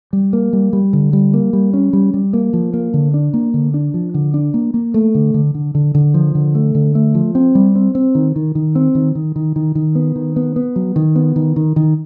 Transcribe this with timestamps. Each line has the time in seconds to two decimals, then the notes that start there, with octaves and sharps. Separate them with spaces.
0.13 G3
0.33 A#3
0.53 G3
0.73 G3
0.93 D3
1.13 G3
1.33 A#3
1.53 G3
1.73 C#4
1.93 G3
2.14 G3
2.33 A#3
2.53 F3
2.73 A#3
2.94 D3
3.14 D4
3.34 A#3
3.54 D3
3.74 D4
3.94 F3
4.14 D3
4.34 D4
4.54 A#3
4.74 A#3
4.94 A3
5.15 D3
5.34 D3
5.54 D3
5.75 D3
5.95 D3
6.14 F3
6.35 D3
6.55 A3
6.75 D3
6.95 A3
7.15 F3
7.35 C4
7.55 G3
7.75 C4
7.95 C4
8.15 D#3
8.36 D#3
8.55 D#3
8.75 C4
8.95 D#3
9.15 D#3
9.36 D#3
9.56 D#3
9.75 D#3
9.95 B3
10.16 D#3
10.36 B3
10.56 B3
10.76 F#3
10.96 D#3
11.16 B3
11.36 D#3
11.56 D#3
11.76 D#3